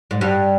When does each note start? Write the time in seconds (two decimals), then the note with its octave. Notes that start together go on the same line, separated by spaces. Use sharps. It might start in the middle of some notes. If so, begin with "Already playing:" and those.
0.11 G#2
0.21 G2